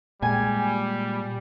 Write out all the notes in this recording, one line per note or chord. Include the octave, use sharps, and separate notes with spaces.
A#2 G3 G#3 G#5